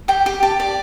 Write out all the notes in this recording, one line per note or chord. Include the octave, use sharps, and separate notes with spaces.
G4 G5
G4
G4 A5
D5